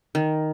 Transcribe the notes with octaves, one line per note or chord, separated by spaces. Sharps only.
D#3